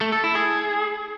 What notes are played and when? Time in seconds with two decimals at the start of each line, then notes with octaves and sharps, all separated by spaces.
0.01 A3
0.12 A4
0.24 E4
0.35 G#4